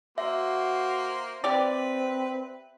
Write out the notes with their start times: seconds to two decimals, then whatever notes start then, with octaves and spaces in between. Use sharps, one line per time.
0.18 A#3 F#4 C5 E5
1.44 C4 G4 B4 D5